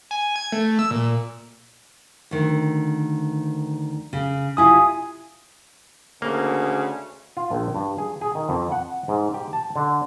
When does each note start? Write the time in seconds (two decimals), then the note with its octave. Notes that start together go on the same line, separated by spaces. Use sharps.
0.11 G#5
0.36 G#6
0.52 A3
0.79 E6
0.91 A#2
2.31 D2 D#3
4.13 C#3
4.57 C3 E4 F4 G#5 D#6
6.22 D2 C#3 A#3
7.37 F4
7.51 A#1
7.75 G2
7.98 G#4
8.21 G#4
8.35 D#3
8.49 F2
8.72 F#5
9.08 G#2
9.34 G4
9.53 A5
9.76 D3